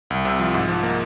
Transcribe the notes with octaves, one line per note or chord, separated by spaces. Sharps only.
C2
C3
F3
G#2
F3
A#3